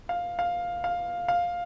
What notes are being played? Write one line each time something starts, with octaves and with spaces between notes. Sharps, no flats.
F5
F5
F5
F5